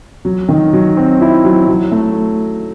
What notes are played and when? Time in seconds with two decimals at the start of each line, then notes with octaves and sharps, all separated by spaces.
0.25 F#3
0.49 D#3
0.73 F#3
0.97 C4
1.21 E4
1.45 F#3
1.68 F#3
1.92 A3